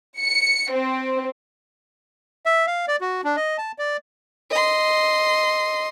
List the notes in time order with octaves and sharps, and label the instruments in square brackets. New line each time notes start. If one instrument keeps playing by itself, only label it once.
[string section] C#7
C4
[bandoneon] E5
F5
D5
F#4
D4
D#5
A5
D5
[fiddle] D#5 C6